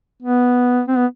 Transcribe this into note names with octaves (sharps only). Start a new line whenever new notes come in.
B3
C4
B3